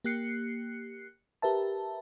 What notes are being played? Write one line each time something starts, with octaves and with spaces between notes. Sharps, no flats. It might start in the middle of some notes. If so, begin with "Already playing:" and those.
A#3 G4 F#6 C7 C#7
G4 A#4 B4 E5 A5